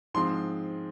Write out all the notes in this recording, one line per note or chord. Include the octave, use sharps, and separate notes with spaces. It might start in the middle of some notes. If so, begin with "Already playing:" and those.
G#2 F3 G#3 C4 C6